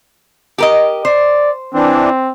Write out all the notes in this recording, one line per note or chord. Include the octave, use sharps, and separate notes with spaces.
G4 A#4 D#5
C5 D5
E3 C4 D4